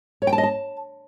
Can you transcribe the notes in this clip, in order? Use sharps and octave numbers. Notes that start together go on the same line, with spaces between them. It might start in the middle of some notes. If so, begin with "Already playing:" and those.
C#5
G5
A5
D#5
A5